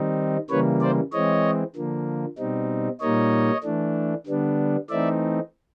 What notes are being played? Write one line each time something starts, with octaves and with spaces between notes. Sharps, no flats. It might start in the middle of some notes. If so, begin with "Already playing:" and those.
Already playing: D#3 G3 C4 D#4
C#3 E3 G3 A#3 B4 C#5
C5 D5
E3 G#3 C4 C#5 D#5
D3 F3 A#3
B2 G3 C4 D#4
A#2 G3 A#3 D#4 C#5 D#5
E3 A3 D4
D3 G3 B3 D4
E3 A3 C4 D#4 D5 E5